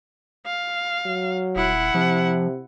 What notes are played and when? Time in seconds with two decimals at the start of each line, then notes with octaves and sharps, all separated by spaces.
0.46 F5
1.06 F#3
1.56 D#1 E4 F#5
1.95 C3 F3